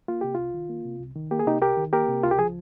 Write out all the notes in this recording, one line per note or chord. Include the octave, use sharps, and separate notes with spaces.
A#3 F4
C3 G4
C2 F4
D#3
A#3
C3
C2
D#3
A#3 G4
G#4
C3 D#4 G4
C2 G4 A#4
D#3
A#3 G4 A#4
C3
C#2 F4
G4
F3 G#4